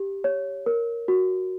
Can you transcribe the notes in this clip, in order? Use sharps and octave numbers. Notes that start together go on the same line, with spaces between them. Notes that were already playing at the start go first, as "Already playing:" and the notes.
Already playing: G4
C#5
A#4
F#4